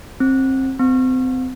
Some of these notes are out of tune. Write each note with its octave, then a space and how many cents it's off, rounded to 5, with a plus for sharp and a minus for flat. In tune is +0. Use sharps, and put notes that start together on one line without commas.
C4 +25
C4 -30